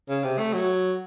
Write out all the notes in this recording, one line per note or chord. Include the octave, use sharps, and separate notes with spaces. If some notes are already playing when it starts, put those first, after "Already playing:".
C#3
C3
A3
F#3